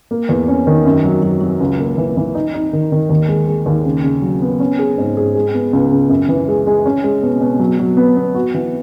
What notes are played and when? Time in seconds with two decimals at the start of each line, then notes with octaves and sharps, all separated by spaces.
0.11 A#3
0.29 E2
0.48 C#4
0.67 D#3
0.85 F#2
1.04 F#3
1.23 F#3
1.41 F#3
1.60 C#2
1.79 A#3
1.98 E3
2.17 E3
2.35 D#4
2.54 D#4
2.73 D#3
2.92 D#3
3.10 D#2
3.28 G#3
3.48 G#3
3.66 D#2
3.86 C#3
4.04 C#3
4.22 F#3
4.42 B3
4.60 C#4
4.79 G#4
4.98 G#2
5.17 G#4
5.35 G#3
5.54 B3
5.73 C#2
5.92 C#3
6.10 F#2
6.29 E3
6.48 G#3
6.67 G#3
6.86 C#4
7.04 G#3
7.23 B2
7.41 B2
7.59 F#3
7.79 F#3
7.97 B3
8.17 B3
8.34 F#4
8.54 E3